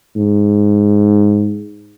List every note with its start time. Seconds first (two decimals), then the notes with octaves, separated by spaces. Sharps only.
0.16 G#2